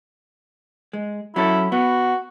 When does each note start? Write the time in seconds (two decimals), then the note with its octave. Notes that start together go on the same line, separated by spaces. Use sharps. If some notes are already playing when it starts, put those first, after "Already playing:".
0.93 G#3
1.36 F#3 C#4 E4 A4
1.72 B3 F#4